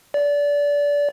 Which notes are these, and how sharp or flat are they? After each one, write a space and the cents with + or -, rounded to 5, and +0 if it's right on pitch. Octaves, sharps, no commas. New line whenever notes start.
D5 -25